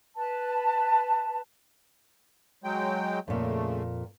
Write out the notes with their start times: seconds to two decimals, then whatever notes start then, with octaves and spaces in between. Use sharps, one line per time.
0.16 B4 A5
2.64 F#3 G#3 G5
3.28 F2 A#2 C#3 A3